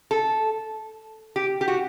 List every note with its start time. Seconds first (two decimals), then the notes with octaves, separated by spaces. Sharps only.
0.11 A4
1.36 G4
1.61 G4
1.68 F#4